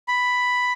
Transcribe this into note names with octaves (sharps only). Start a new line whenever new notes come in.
B5